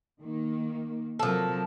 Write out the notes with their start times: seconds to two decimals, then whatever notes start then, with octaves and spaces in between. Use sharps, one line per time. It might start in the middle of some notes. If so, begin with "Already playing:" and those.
0.21 D#3 A#3
1.19 C3 F3 F#3 A4 A#4